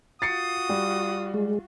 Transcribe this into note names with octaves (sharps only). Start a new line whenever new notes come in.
F4 F#4 D#6 A6 C7 C#7
G3
G#3